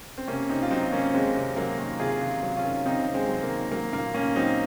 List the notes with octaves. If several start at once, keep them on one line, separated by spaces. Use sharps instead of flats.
C4
C3 A#3 C#4
C3 C4 D#4
F4
F#3 C4 D#4
D#3 A#3 C#4
C3 G#3 C4
C3
F#3 A#3
D#3
C3 F4 G#4
C3
F#3
C#4 F4
D#3
C3 C4 D#4
C3
G#3 C4
F#3
A#3
D#3
F#3 A#3
A#2 A#3
A#2 A#3 C#4
F#3 C4 D#4